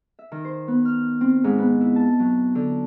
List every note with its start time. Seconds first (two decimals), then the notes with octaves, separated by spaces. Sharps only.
0.19 E5
0.32 D#3
0.45 C5
0.68 B3
0.85 F6
1.21 C4
1.44 G#2
1.58 B3
1.81 E4
1.96 A5
2.19 F#3
2.55 D3